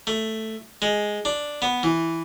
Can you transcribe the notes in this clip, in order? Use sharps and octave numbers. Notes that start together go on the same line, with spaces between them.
A3
G#3
D4
B3
E3